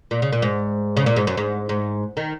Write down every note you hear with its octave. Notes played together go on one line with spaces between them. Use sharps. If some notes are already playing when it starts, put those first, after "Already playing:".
A#2
C#3
A#2
G#2
C#3
A#2
G#2
F#2
G#2
G#2
D#3